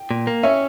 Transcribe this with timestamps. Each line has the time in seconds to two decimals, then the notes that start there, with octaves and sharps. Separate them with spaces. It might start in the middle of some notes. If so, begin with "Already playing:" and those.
Already playing: G5
0.11 A#2
0.27 A#3
0.43 C#4 C#5 E5